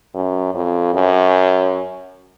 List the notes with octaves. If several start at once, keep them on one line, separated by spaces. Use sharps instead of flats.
F#2
F2
F#2